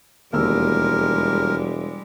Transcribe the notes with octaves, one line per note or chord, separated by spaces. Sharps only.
E1 D#2 G3 G#3 A#4 E6